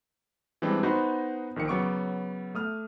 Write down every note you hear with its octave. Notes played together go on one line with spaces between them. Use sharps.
E3 G3 G#3 C4 D4
B3 D#4 F#4 C5 D#5 B5
A#1 D#3 F3 C#7
C#3 F#3 B3 C#6 D6 D7
A3 D#6 F6